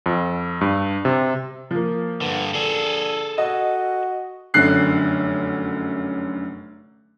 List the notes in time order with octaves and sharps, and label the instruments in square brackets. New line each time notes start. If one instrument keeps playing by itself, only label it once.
[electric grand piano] F2
G2
C3
[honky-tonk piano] F3 A#3
[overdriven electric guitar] G2 D3 [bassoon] B3
[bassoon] D3 [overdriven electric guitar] G#4 A4
[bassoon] F#4 [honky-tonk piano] D#5
[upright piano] F1 F#2 D3 F#6 C7